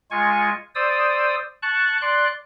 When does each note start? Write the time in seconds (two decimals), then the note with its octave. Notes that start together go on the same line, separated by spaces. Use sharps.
0.11 G#3 F4 G#5 C#6
0.75 C5 D5 D#6 E6
1.62 A5 C#6 F#6
2.01 D5 C6 F#6